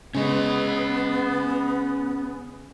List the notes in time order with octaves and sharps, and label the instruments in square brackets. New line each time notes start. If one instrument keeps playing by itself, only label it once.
[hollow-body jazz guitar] C#3 G#3 [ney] B3 [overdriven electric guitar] C#4 D#5